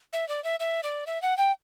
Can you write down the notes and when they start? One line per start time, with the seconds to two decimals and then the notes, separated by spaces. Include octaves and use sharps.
0.13 E5
0.28 D5
0.44 E5
0.60 E5
0.83 D5
1.07 E5
1.22 F#5
1.38 G5